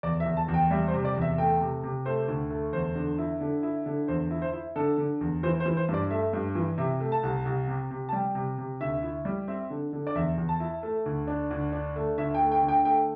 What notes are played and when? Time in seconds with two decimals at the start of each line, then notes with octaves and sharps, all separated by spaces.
0.03 E2 D5
0.20 E5
0.26 E2
0.37 A5
0.48 E2
0.54 G5
0.71 G3 E5
0.88 C5
0.94 C3
1.05 D5
1.16 E2
1.22 E5
1.38 A3 G5
1.61 C3
1.83 C3
2.06 A3 C5
2.28 D2
2.50 A3
2.73 E2 C5
2.95 D3
3.18 E4
3.41 D3
3.63 E4
3.86 D3
4.08 E2 C5
4.31 E4
4.42 C5
4.53 E4
4.76 D3 A4
4.98 D3
5.21 E2
5.43 E3 C5
5.60 C5
5.66 E3
5.77 C5
5.89 G2
5.94 D5
6.11 A3 E5
6.33 G2
6.55 E3
6.78 C3 E5
7.00 A3
7.12 A5
7.23 C2
7.45 C2
7.68 C3
7.91 C3
8.09 A5
8.13 G3 G5
8.35 C3
8.58 C3
8.81 D2 E5
9.03 E4
9.25 G3
9.48 C4 E5
9.70 D3
9.93 D3
10.07 D5
10.15 E2 E5
10.38 E2
10.49 A5
10.60 E4
10.83 A3
11.06 D2
11.27 D4
11.51 D2
11.73 D4
11.96 A3
12.18 D2 E5
12.34 G5
12.41 A3
12.52 G5
12.63 D3
12.68 G5
12.85 A3 G5